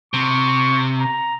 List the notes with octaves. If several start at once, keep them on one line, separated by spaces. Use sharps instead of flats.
C3 C#6
A#5